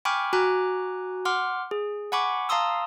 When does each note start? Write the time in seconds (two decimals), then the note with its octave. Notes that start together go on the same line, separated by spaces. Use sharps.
0.05 G5 G#5 B5 C#6 D6 F6
0.33 F#4 G#5 A#5 D6 F#6
1.25 F#5 C6 D6 F6
1.71 G#4
2.12 F#5 G#5 B5 C#6 D6
2.49 F5 A5 A#5 C6 D#6 E6